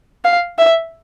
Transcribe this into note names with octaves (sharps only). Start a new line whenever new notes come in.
F5
E5